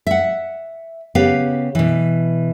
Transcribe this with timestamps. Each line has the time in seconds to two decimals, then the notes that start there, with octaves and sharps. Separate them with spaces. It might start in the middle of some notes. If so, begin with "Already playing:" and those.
0.07 E5 F#5
1.15 C#3 B3 G4 F5
1.75 B2 E3